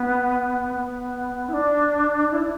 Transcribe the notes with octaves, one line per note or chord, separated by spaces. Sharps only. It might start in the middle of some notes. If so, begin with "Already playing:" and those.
Already playing: B3
B3
E4
D4
E4
D4